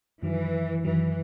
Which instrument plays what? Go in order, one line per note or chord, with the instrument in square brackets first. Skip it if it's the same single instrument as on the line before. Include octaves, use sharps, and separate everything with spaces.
[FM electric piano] F#2 D#3 F#3 [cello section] E3
[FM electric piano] F#2 D#3 F#3 [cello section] E3